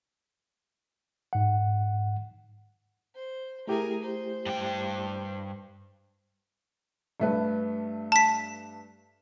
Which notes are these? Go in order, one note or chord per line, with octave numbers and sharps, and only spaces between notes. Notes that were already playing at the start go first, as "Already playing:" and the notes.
G#2 F#5
C5
A3 E4 G4 G#4 A#4
C5
G2 G5
G2 A3 B4
A5 B6